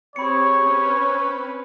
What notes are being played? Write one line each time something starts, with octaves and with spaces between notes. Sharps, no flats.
C4 G4 G#4 C#5 B5 C#7
C4 C#4 B4